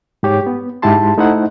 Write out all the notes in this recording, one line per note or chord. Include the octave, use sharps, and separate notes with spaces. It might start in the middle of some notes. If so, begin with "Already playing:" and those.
G#2 G4 C#5
B3
G#2 E4 G4 A5 C6
A3 D#4 E4 C5 F#5